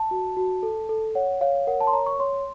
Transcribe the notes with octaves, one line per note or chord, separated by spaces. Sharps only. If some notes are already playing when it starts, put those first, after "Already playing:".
Already playing: A5
F#4
F#4
A4
A4
C#5 F#5
C#5 F5
A#4 F#5
A5
C6
C#5 A#5
C#6
C#5 C6